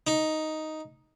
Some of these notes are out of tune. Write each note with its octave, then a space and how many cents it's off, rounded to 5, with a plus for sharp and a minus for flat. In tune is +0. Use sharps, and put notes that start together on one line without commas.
D#4 +5